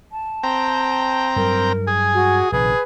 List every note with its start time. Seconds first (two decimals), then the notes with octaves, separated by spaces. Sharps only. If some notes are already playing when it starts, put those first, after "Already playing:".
0.12 A5
0.43 C4 G5 A#5
1.36 G2 F#3 A#4
1.87 G#4 G#5
2.14 F#4
2.52 A#1 C3 D#3 G#4 B4